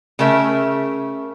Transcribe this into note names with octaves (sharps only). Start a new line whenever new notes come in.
C#3 A3 A#4 E5